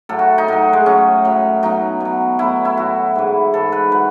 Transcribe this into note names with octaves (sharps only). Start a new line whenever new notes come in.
A2 F#3 A4
F#4
D#4
A2 F#3 D#4
G#3
A2 F#3 C#4
A2 F#3
B2 F#3 D#4
B2 F#3
A2 F#3 E4
E4
A2 F#3 F#4
G#2 E3
G#2 E3 A4
B4
F#3 B4